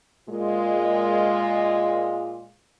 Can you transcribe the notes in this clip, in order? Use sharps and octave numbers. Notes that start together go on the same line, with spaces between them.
A#2 G#3 F4